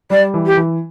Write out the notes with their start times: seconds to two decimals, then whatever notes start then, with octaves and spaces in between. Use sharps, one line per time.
0.10 G3 D5
0.34 E3
0.45 G4
0.57 E3